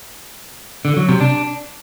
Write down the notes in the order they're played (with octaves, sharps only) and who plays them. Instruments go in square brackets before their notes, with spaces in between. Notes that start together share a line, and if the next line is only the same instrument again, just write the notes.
[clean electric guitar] D3
F#3
C3
D4